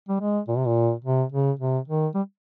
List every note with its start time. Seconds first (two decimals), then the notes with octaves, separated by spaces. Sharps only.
0.09 G3
0.20 G#3
0.48 A#2
0.57 C3
0.67 A#2
1.04 C3
1.32 C#3
1.59 C3
1.88 D#3
2.14 G3